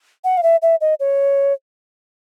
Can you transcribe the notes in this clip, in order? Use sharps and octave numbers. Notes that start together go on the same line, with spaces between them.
F#5
F5
E5
E5
D#5
C#5